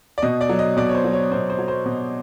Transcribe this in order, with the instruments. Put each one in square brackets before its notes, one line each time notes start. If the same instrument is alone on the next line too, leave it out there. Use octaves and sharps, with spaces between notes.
[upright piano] D5
B2 D#5
D5
F#3
D#5
B2 D5
C#5
C5
F#3
C#5
B2 C5
C5
F#3
C5
B2